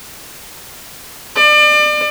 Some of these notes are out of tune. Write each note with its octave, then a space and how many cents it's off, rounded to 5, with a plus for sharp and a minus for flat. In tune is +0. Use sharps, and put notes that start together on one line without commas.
D5 +35